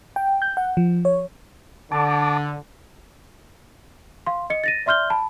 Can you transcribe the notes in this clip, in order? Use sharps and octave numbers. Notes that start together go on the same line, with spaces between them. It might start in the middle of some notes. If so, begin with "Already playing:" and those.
G5
G6
F#5
F3
C#5
D3 A5 D6
F5 C6
D#5 C#7
A6 A#6 D#7
D5 E5 C6 F6 G6 G7
A5 B5